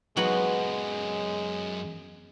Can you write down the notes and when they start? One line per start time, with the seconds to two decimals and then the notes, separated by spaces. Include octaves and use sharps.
0.17 F#2 F#3 G#3 B3 F4 B5